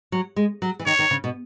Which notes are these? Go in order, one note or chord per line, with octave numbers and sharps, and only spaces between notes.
F#3
G#3
F#3
E3
D#3 C#5
D#3
C#3
B2